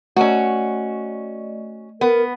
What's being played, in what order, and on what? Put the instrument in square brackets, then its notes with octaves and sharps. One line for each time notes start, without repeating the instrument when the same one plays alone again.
[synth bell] A3 D5 D#5 [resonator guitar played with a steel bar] C#4 F#4
[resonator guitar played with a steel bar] B3 [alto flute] A#4